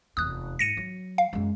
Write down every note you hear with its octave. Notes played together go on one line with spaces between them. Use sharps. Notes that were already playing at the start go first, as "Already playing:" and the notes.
F1 E2 D#6 F#6
G#2 A#6 C#7 D#7
F#3
F5
F#2 G#3